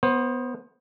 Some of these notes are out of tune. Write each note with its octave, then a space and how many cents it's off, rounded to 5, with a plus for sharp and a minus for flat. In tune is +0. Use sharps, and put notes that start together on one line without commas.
B3 +0 C5 +25